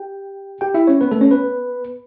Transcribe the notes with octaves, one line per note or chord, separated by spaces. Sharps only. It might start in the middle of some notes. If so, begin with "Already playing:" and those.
Already playing: G4 G5
G4 G5
E4 E5
C#4 C#5
B3 B4
A3 A4
C#4 C#5
B3 B4